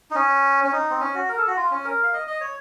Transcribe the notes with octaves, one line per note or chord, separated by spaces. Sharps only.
D#4
C#4
C#4
D#4
C4
C#4
F#4
A#4
A4
F#4
F4
C#4
A#4
F5
D#5
D#5
C#5